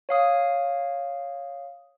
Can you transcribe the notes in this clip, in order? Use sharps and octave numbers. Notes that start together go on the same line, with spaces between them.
C#5 F5 D#6